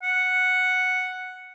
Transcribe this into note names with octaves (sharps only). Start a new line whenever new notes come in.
F#5